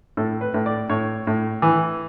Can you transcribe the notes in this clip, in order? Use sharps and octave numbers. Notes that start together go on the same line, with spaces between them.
A2 A4
B4
A2
D5
A2 C#5
A2
E3